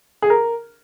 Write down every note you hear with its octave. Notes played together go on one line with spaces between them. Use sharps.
G#4
A#4